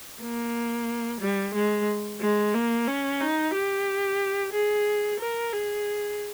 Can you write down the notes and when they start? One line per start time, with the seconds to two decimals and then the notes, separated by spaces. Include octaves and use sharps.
0.22 A#3
1.21 G3
1.55 G#3
2.21 G#3
2.54 A#3
2.87 C#4
3.20 D#4
3.54 G4
4.53 G#4
5.20 A#4
5.52 G#4